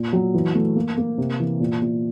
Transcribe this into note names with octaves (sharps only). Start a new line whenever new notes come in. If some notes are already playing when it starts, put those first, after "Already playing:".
Already playing: A#2
F#3
E3
A3
A#3
A#3
C3
E3
A#2
A#2